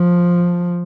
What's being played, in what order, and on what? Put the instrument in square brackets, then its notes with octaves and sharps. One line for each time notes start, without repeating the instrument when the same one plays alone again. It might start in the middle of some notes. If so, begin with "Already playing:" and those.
Already playing: [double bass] F3